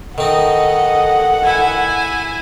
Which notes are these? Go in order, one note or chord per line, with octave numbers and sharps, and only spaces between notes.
D#3 D#4 A4 D#5 F#5
E4 G#5